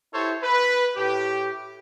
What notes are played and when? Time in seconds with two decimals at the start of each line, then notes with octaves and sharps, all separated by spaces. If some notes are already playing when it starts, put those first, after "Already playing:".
0.13 E4 G4 A4 C5 C#5
0.43 B4
0.97 A2 G4